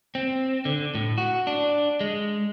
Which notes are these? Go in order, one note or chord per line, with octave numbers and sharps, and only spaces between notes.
C4
D3
A2
F#4
D4
G#3